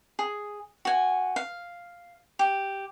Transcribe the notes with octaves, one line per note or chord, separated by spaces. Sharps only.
G#4
F#4 G#5
F5
G4